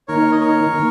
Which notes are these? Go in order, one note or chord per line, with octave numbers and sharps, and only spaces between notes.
D#3 A#3 D#4 A#4 C#5
D#5
A#4 C#5
D#3 A#3